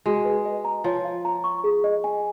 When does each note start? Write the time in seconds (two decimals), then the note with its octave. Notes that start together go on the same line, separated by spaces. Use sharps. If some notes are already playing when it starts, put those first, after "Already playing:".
0.06 G#3 F#4
0.25 B4
0.45 D#5
0.65 A#5
0.84 F3 C#5
1.05 F5
1.25 A#5
1.44 C#6
1.64 G#4
1.84 D#5
2.04 G#5